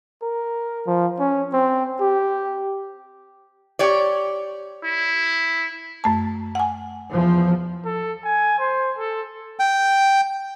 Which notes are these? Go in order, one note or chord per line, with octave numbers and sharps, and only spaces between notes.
A#4
F3
C#4
C4
G4
G4 C#5 D5
E4
F#2 A3 A5
F#5 G#5
E2 F3
A4
G#5
C5
A4
G5